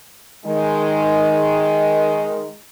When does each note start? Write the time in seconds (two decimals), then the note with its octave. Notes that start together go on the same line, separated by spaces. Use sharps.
0.46 D#3 G#3